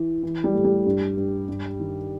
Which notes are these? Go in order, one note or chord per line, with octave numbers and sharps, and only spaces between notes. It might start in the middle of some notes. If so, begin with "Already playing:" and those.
Already playing: E3
E3
G3
A2
G3
G2
G2
G2
D#3